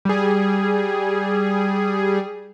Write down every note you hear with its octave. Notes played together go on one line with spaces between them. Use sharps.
G3 G#4